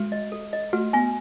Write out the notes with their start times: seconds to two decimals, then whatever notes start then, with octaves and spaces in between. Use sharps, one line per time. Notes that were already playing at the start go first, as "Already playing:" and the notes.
Already playing: G#3 F#4
0.12 D#5
0.32 A4
0.53 D#5
0.73 A3 F#4
0.93 B3 G#5